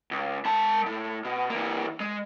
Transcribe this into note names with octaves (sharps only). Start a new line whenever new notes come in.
C#2
G#3 A5
A2
B2
E3 A#3
G#3